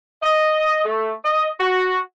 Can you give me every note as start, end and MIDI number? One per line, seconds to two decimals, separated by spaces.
0.23 0.84 75
0.84 1.13 57
1.24 1.48 75
1.60 1.98 66